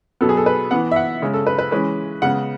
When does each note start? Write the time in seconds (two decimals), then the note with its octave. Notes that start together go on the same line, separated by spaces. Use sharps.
0.21 B2 F#3 B3 A4
0.29 G#4
0.37 A4
0.46 B4
0.71 E3 B3 F#5
0.91 E5
0.96 F#5
1.22 C#3 G#3 C#4
1.33 A4
1.47 B4
1.59 B4
1.71 E3 G#3 C#4 B4
2.22 C#3 G#3 B3 F#5